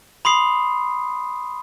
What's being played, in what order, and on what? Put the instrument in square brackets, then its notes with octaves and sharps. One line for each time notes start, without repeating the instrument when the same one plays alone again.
[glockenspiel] B5 C6 D#6 C7